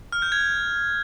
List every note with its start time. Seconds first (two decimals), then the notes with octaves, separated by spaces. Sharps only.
0.12 F6
0.22 G6
0.32 G#6